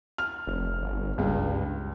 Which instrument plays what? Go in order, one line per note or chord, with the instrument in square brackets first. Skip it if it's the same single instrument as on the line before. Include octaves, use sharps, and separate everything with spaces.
[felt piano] F6
[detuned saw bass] F1
G1
[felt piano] C#2 [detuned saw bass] G2